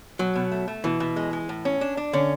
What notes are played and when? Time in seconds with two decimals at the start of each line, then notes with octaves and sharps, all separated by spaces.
0.19 B2 F#3
0.35 B2
0.51 A3
0.68 A3
0.84 B2 E3
1.00 B2
1.16 G#3
1.33 G#3
1.49 A2
1.65 C#4
1.81 D4
1.97 D4
2.13 D3 C#4